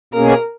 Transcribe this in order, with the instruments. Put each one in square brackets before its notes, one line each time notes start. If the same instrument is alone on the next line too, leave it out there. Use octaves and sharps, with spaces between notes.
[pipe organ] B2 A#3 C#4 G#4 [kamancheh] A#4